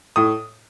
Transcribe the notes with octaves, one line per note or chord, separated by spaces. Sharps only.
A2 D#6